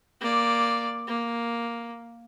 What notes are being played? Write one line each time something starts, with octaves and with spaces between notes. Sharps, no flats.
A#3 D5
A#3